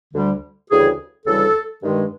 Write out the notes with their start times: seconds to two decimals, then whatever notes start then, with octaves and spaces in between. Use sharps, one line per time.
0.13 D2 D3 G3
0.69 D2 C#3 E3 G3 G#4
1.26 D2 C#3 E3 G3 A4
1.83 G2 D#3 G#3